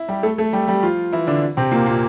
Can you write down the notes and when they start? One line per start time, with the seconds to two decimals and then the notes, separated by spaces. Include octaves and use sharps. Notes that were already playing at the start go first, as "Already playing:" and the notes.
Already playing: E4
0.08 G3 G4
0.23 A3 A4
0.38 A3 A4
0.53 G3 G4
0.68 G3 G4
0.83 F3 F4
1.13 E3 E4
1.27 D3 D4
1.57 C3 C4
1.71 A#2 A#3
1.86 A#2 A#3